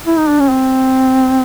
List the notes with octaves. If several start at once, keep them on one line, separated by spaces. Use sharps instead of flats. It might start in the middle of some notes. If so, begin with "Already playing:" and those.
E4
D#4
D4
C#4
C4